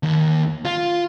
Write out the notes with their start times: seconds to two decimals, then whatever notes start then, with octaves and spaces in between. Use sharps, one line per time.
0.03 D#2
0.65 F4